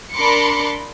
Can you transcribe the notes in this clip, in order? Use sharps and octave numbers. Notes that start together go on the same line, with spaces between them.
D4 A#4 B5 C6 D6 C#7